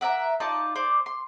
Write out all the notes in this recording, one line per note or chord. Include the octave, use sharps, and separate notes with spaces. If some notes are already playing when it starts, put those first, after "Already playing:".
A#4 D5 E5 F#5
D#4 F4 D5 A5
C5 D5
C6